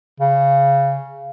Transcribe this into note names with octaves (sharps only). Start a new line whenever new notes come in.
C#3